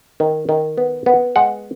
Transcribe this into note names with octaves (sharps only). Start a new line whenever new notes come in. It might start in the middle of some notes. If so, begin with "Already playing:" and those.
D#3
D#3
B3
B3
G#3 F#5